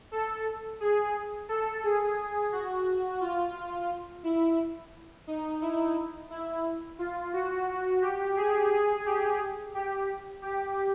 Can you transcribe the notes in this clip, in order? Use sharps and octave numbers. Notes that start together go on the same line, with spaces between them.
A4
G#4
A4
G#4
F#4
F4
E4
D#4
E4
E4
F4
F#4
G4
G#4
G#4
G4
G4
G4